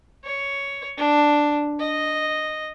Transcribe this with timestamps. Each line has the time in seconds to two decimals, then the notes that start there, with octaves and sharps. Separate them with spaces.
0.24 C#5
0.97 D4
1.80 D#5